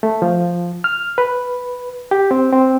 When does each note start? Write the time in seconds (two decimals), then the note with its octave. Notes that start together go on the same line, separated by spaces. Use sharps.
0.03 A3
0.22 F3
0.84 F6
1.18 B4
2.11 G4
2.31 C4
2.53 C4